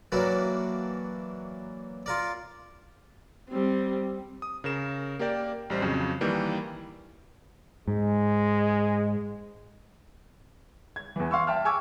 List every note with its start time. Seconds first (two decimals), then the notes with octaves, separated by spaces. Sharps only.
0.12 E3 F#3 A#3 D4 F#4
2.06 F4 A#4 D5
3.49 G3 C4
4.42 D#6
4.64 C#3 A#4 E7
5.19 A#3 G4 A#4 D5 G5
5.70 A1 G3 C5
5.82 F2 C#3 F#3
6.21 D#3 E3 G3 A#3
7.88 G#2 G#3
10.96 G#6
11.16 E2 E3
11.31 F5 C6 C#6 E6
11.47 E5 G5 A5 F6
11.65 G#5 C#6 D6 E6 G#6